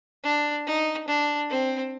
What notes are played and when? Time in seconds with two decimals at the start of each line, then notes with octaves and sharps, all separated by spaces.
0.24 D4
0.67 D#4
1.08 D4
1.49 C4